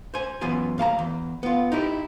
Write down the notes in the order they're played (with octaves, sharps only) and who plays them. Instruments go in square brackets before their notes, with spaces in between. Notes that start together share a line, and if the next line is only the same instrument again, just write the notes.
[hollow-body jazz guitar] C5 G#5
F#2 E3 B3 F4 G#5
D#2 F5 A5 A#5
E2
B3 F4
D#4 E4 G4